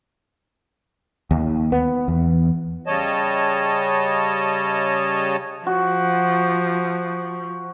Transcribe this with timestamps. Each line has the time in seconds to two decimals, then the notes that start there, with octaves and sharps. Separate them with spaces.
1.31 D#2
1.72 B3
2.08 E2
2.87 C#3 G3 C#5 D#5 A5
5.67 F3 F#4